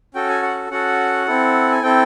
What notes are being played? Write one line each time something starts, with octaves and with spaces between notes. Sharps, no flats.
C#4 F#4 A4 G5
G#5
F#5
C#4 F#4 A4 F#5
C4 E4 A4
G#5
C4 E4 A4 G5